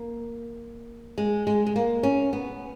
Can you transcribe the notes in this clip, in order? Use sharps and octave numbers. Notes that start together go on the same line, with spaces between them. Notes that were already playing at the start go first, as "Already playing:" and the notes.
Already playing: A#3
G#3
G#3
G#3
A#3
C#4
B3